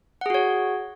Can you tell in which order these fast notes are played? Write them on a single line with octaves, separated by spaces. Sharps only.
F#5 G#4 F#4 C#5